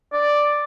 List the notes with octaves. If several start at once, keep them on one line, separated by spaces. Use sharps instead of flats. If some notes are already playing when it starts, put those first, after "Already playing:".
D5